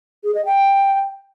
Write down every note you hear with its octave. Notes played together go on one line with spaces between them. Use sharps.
G#4
D#5
G5